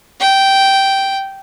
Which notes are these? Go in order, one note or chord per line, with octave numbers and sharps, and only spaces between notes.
G5